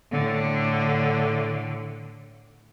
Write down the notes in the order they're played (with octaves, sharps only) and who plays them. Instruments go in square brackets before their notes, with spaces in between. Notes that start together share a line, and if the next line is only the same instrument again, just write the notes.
[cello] A2 D3